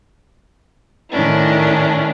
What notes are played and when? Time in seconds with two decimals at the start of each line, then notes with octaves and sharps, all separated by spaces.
1.10 A2 D#3 C#4 D4 E4